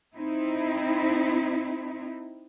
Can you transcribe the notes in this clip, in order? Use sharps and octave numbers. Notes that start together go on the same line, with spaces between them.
C4 D#4 E4